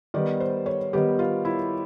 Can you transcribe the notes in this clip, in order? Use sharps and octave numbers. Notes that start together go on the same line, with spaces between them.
D#3 G3 B3 D5
C5
C#5
D#3 G3 B3 G4
F4
E4